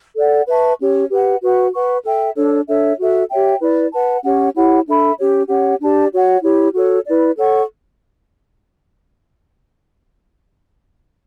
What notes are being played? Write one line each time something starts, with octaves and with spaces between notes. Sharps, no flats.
A4 D5 F#5
B4 E5 A5 C#6
C#4 G4 C#5
G4 B4 F#5
F#4 B4 F#5 C#6
B4 F#5 C#6
A4 E5 G5
D4 A4 C#5
D4 A4 C#5 E5
F#4 A4 E5
G4 C#5 E5 G5
E4 B4 D5
B4 F#5 A5
C#4 G4 C#5 F#5
E4 G4 C#5 F#5
D4 A4 E5 B5
C#4 G4 C#5
C#4 G4 C#5 F#5
D4 G4 D5 A5
F#4 C#5 F#5
E4 G4 C#5
F#4 A4 C#5
E4 B4 D5
A4 C#5 F#5 C#6